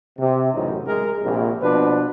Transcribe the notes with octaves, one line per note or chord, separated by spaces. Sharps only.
C3
A1 F#2 C#3 D#4
G#3 G#4 A#4
A#1 C3
B2 F3 D4 B4